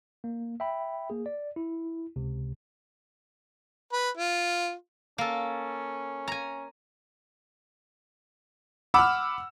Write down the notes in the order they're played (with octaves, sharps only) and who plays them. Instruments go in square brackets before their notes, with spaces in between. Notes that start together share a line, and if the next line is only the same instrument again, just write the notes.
[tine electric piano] A#3
E5 G5 B5
A#3 G#4
D5
E4
C#2 C3
[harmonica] B4
F4
[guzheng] A#3 A4 [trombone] C#4
[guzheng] G#5 A#5
[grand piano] F#5 F6 [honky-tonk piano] B5 D6 E6